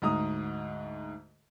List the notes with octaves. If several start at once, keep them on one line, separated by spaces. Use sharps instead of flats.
D2 G#2 A#5 D#6